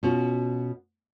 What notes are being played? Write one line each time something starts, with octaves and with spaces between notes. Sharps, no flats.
B2 C#4 F4 F#4